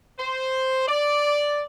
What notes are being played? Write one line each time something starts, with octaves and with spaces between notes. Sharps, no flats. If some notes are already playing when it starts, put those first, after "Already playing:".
C5
D5